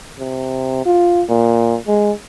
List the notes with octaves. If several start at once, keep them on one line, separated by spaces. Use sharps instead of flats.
C3
F4
A#2
G#3